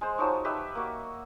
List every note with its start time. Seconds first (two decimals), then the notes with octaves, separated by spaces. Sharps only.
0.01 G#3 C5
0.18 F3 F#3 D#4 C#5
0.45 G4 B4 D#5 E5
0.75 A#3 F#4